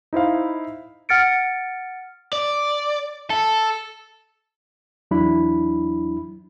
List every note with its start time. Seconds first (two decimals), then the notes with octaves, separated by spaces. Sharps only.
0.13 D#4 E4 C5 F5
1.09 F#5 F6 A6 C#7 D7
2.33 D5
3.30 A4
5.11 E2 F#3 D4 E4 B5